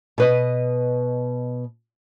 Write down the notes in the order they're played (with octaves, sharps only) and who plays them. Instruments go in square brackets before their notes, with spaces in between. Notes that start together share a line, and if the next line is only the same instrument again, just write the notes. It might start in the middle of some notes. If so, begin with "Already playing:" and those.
[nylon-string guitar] B2 B4 D#5